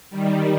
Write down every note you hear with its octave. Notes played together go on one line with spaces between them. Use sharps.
D#3 G3